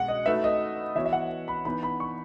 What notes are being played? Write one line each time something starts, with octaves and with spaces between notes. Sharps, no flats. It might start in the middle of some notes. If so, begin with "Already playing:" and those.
Already playing: B2 G#3 F#5
D#5
A3 D#4 F#4 B4 E5
D#5
E3 B3 F#4 C#5 E5
E5
F#5
B5
E3 B3 D#4 B5
B5
C#6